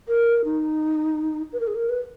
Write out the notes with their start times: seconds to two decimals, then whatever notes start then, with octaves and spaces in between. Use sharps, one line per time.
0.08 A#4
0.45 D#4
1.53 B4
1.60 A#4
1.67 G#4
1.75 A#4
1.89 B4